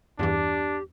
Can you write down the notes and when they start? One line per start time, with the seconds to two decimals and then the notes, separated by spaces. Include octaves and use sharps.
0.19 E2 G2 E3 D4 G4